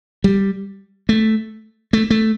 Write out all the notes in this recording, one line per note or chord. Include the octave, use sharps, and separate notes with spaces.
G3
A3
A3
A3